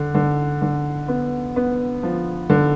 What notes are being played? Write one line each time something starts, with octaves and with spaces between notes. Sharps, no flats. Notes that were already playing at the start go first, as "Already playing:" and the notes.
Already playing: D3
D3
D3
B3
B3
F3
D3